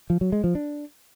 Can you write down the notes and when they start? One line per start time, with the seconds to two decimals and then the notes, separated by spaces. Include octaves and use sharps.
0.10 F3
0.21 F#3
0.32 G#3
0.44 F3
0.55 D4